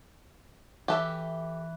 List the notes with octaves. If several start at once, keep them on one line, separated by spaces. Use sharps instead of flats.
E3 G4 A4 E5